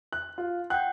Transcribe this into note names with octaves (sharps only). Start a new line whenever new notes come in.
F#6
F4
F#5 G5 F#6 G6